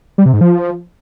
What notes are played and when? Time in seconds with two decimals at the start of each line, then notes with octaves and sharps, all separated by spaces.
0.18 G3
0.26 C3
0.33 G#2
0.41 F3